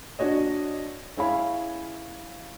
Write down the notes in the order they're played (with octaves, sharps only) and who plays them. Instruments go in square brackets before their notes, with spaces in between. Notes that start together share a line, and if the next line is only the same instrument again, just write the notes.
[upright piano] D4 F#4 C#5 D#5
C#4 E4 G#4 C#5 F5 B5